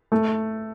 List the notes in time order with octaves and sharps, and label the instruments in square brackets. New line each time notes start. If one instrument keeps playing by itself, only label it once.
[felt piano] A3